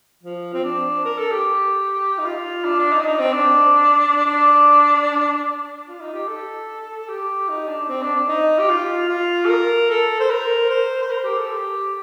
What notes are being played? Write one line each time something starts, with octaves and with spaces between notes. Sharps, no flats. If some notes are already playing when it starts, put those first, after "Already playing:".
F3
C4
D4
A#4
A4
G4
D#4
F4
D4
D4
D#4
D4
D#4
C4
D4
D4
F4
D#4
G4
A4
G4
D#4
D4
C4
D4
D4
D#4
G4
F4
F4
A4
A#4
A4
C5
A#4
C5
C5
A#4
G4
A4
G4